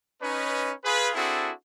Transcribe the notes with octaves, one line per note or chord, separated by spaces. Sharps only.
C#4 D#4 B4
F4 G#4 B4
C4 D4 E4 F#4 G#4 A4